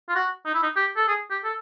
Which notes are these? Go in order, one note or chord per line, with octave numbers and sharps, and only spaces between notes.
F4
F#4
D#4
E4
D#4
G4
A4
G#4
G4
A4